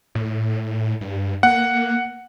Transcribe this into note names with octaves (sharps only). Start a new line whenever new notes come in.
A2
G2
A#3 F#5